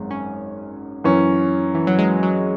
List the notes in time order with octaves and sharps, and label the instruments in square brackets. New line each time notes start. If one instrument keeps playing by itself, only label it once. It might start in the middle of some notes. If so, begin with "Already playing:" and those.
Already playing: [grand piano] G#1 F#2 [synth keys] G#3
[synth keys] C#4
[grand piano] F#2 E3 C#4
[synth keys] E3
F#3
G#3
F#3